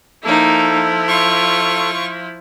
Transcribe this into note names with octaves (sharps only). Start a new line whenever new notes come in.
F3 A#3 D#4 E4 A4
F4 C#6